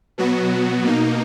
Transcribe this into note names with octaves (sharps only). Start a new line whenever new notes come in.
B2 F#3 B3 F#4
B2 A#3 D#4